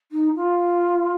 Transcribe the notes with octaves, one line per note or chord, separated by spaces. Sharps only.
D#4
F4